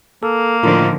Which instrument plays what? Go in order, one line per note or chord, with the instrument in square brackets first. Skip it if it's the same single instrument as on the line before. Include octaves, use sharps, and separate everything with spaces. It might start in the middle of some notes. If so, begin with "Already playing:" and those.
[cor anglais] A#3 [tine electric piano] A4
[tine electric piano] A2 F4 A#4 [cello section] D3 D#3 F3